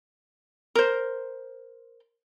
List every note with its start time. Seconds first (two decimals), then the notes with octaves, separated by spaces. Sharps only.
0.75 A#4 C5